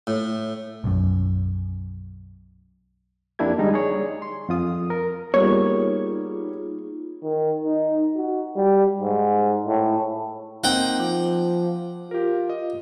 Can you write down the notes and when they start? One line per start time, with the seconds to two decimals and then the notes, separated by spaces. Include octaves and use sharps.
0.07 A2
0.84 B1 F#2
3.39 F2 A#3 D4 E4 G4 G#6
3.58 D3 G3 G#3 D#4
3.74 G#4 C#5 D5
4.22 C6
4.49 F2 F4 D#6
4.90 A#4
5.34 G3 A#3 B3 D#4 F4 G#4 C#5
7.23 D#3
7.64 D#4
8.17 F#4
8.56 G3
9.00 G#2
9.66 A2
10.64 A#3 C4 D#4 F#5 G5
11.00 F3 D6
12.11 F4 G4 A#4
12.50 D#5